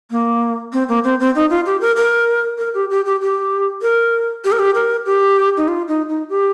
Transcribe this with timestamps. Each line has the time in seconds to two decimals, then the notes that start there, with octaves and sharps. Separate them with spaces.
0.11 A#3
0.73 C4
0.89 A#3
1.04 C4
1.20 C4
1.35 D#4
1.50 F4
1.66 G4
1.81 A#4
1.96 A#4
2.58 A#4
2.74 G4
2.90 G4
3.06 G4
3.21 G4
3.82 A#4
4.44 G4
4.52 A#4
4.59 G4
4.75 A#4
5.06 G4
5.57 D#4
5.68 F4
5.88 D#4
6.09 D#4
6.29 G4